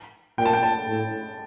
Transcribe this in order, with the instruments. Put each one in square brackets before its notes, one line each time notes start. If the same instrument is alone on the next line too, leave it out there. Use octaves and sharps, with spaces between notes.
[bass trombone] A#2 [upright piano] G5
[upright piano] A5
G5
A5
[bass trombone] A2